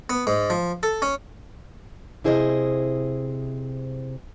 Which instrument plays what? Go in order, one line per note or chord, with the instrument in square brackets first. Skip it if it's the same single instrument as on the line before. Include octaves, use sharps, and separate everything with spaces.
[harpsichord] B3
G#2
F3
A4
C#4
[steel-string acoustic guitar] C3 E4 G#4 C5 C#5 D#5